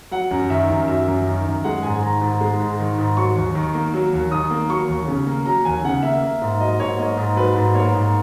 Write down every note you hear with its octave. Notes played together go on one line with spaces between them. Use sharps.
F#3 F#5
F#2
D#3 E5
F#2
F#3 E5
F#2
D#3
F#2
G#3 F#5
G#2 G#5
D#3 A#5
G#2
G#3
G#2
D#3
G#2
F#3 C#6
D#2
D#3
A#3
F#3
D#2
D#3 D#6
A#3
F#3 C#6
D#2
C#3
A#3
F#3 A#5
D#2 G#5
C#3 F#5
A#3 E5
A#3
G#2
F#3 D#5
G#2 C#5
A#3 D#5
G#2
F#3 B4
G#2
A#3 C#5
G#2